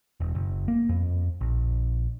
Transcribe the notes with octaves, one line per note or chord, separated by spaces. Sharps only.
E1
F#1
A#3
F2
A#1